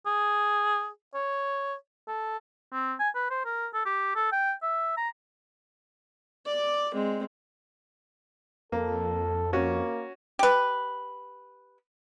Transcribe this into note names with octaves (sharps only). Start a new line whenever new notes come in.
G#4
C#5
A4
C4
G#5
B4
C5
A#4
A4
G4
A4
G5
E5
A#5
D5 D6
G#3 C4
F2 A#3 A4
A#3 C#4 F#4
G4 B4